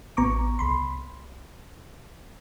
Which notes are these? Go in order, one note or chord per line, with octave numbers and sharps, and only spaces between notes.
A1 B3 A#5 C#6 D6
C2 B5 C6